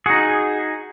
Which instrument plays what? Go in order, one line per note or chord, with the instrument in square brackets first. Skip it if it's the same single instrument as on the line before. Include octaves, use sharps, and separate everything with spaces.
[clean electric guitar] D#4 F#4 [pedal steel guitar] G#4